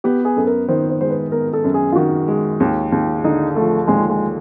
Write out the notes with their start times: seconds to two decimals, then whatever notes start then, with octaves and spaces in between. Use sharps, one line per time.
0.04 B3 G4
0.25 G#4
0.36 F#2 A4
0.47 A#4
0.68 D#3 C5
0.90 C5
1.00 G#3 C5
1.10 B4
1.32 B3 A#4
1.53 A4
1.64 F#2
1.74 G#4
1.92 F4
1.96 D#3 F#4
2.28 G#3
2.60 D#2
2.92 D#2
3.24 D3 D#4
3.56 F3 A3
3.88 D#2 G#3
4.10 G#3